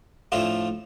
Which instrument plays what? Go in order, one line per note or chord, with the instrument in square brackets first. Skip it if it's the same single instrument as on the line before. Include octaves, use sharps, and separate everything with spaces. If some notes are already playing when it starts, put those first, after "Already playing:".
[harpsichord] A2 F3 A3 D4 F4